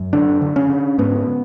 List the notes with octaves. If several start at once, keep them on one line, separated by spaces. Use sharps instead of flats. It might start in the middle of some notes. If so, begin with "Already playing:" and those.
Already playing: F#2
D3 D4
D3
C#4
D3
G#2 B3